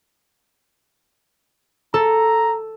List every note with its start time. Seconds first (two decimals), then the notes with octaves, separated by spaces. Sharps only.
1.94 A4 A#5